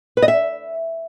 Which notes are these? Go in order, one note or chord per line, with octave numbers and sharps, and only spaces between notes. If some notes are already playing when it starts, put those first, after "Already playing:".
B4
D#5
E5